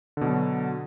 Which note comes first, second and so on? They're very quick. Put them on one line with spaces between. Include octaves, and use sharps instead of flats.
D3 B2 F#3